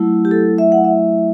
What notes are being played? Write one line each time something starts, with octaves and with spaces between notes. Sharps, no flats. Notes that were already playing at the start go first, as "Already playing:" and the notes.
Already playing: F#3 A3 E4
G4
A4
E5
F#5
E5